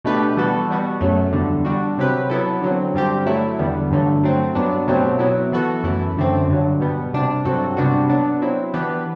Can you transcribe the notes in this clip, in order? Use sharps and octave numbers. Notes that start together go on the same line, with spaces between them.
B2 A3 D4 G4 B4
E3 G3 B3 F#4 A4
B2 G3 B3 F#4
F#2 F#3 A3
E2 D3 G3
D3 G3 D4 F#4
C3 F#3 C4 G4 B4
F#3 B3 E4 A4
D3 F#3 C4
G2 D3 G3 C4 G4
F#3 A3 E4
E2 D3 G3 B3
G2 D3 F#3 A3
F#3 A3 C4
G2 F#3 B3 D4
B2 F#3 A3 C4 G4
F#3 B3 E4
E3 B3 F#4 A4
F#2 E3 A3 E4
F#2 D3 A3 C4
G2 D3 F#3
B2 G3 B3
C3 G3 D4
G2 F#3 C4 F#4 A4
C3 G3 B3 D4 F#4
F#3 B3 D4
F#3 C4 E4
E3 B3 D4 G4 B4